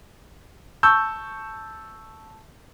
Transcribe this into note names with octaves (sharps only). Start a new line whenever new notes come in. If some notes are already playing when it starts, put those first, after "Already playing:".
A5 C#6 E6 G6